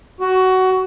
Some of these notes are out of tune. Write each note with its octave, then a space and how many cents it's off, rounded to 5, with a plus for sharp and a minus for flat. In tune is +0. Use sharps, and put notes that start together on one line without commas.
F#4 +15